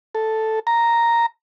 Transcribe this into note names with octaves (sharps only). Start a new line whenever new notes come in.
A4
A#5